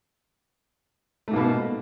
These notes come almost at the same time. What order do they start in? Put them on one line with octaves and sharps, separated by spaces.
A3 G#2 A#3 B2